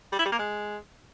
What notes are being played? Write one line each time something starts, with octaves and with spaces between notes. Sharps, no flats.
G3
E4
G3
A#3
G#3